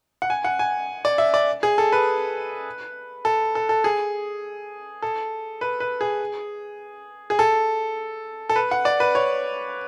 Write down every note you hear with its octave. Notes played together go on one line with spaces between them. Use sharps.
F#5
G#5
F#5
G#5
D5
E5
D5
G#4
A4
B4
A4
A4
A4
G#4
A4
B4
B4
G#4
G#4
A4
A4
B4
F#5
D5
B4
C#5